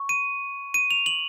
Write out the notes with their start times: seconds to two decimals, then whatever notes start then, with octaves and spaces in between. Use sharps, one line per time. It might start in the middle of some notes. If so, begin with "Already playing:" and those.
Already playing: C#6
0.09 D#7
0.74 D#7
0.91 F7
1.06 F#7